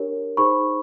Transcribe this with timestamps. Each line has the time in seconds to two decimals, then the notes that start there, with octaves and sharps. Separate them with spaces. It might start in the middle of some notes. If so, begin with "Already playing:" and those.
Already playing: D4 G4 A#4 C#5
0.37 D#4 G#4 C5 B5 C#6